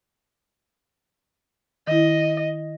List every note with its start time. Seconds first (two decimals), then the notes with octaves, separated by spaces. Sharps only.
1.87 D#3 E4 D#5